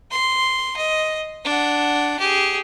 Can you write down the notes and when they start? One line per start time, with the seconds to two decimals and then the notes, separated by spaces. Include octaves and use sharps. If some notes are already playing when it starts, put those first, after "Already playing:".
0.11 C6
0.77 D#5
1.45 D4 F#5
2.19 G4 G#4